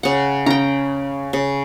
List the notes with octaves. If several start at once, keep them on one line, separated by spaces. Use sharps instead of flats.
C#3 F#5
C#3 G5 A#5
C#3